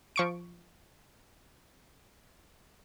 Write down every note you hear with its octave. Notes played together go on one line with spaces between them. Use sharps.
F3 C#6 D7